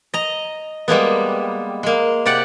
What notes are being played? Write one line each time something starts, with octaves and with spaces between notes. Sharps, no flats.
D#5 A#5
G3 G#3 A#3 B3
G#3 A#3
C3 G4 D5 F#5